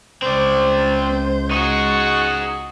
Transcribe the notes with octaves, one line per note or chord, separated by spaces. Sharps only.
C#2 C4 C5 D5
D#4 F#4 G#4 C#6